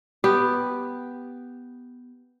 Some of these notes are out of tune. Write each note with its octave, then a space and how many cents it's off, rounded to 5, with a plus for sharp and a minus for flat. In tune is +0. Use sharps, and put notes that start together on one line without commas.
B3 +0 G4 +0